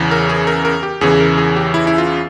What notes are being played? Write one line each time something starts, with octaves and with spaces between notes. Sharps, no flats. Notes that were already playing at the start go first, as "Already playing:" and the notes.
Already playing: E2 C#3 E3
A#4
G#4
A#4
A#4
G4
E2 C#3 E3 G#4
A#4
G#4
G4
E4
E4
F4